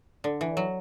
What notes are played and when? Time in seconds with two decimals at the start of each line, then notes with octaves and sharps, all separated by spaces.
0.24 D3
0.41 E3
0.57 F#3